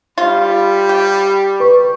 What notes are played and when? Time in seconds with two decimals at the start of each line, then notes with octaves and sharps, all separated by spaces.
0.18 G3 F4 B5
0.89 G4
1.60 B4 C#6